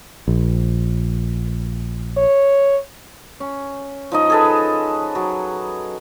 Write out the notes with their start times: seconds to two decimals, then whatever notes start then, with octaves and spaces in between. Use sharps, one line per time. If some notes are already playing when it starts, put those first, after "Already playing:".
0.28 A#1
2.17 C#5
3.40 C#4
4.12 F3 D#4 D#5
4.30 G#4 A4 B4
5.15 F#3